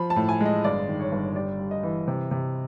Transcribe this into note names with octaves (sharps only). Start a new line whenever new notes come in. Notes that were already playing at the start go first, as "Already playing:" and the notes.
Already playing: F3 B5
A5
A2
G#5
G#3 D#5
G1 D5
D#3
C#5
G1
G3 D5
G3
D#5
E3
C3
C3